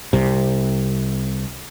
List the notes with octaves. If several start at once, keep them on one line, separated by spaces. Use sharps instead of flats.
C2 C3